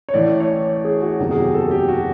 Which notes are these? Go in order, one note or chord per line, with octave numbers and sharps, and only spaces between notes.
C#5
A1 A2 E3 D5
C#5
G#4
F#4
F#1 E2 C3 D#3 F#4
G#4
G4
A4
G4
F#4